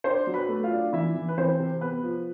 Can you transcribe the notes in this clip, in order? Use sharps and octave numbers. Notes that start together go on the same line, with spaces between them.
D4 C5 C6
F#3
B4 B5
A3
F4 F5
D4
E3 E4 E5
E3
B4
E3 C4 C5
C3
B3 B4
F3